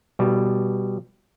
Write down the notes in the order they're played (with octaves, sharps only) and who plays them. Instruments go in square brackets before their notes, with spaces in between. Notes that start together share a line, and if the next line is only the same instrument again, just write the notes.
[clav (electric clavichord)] B2 G3